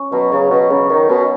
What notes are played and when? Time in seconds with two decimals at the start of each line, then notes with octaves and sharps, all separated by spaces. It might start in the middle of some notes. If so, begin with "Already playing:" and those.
Already playing: C#4
0.12 B2 F#3
0.32 C#3 F#3
0.51 B2 F#4
0.70 C#3 F#3
0.90 D#3 F#3
1.09 B2 C#4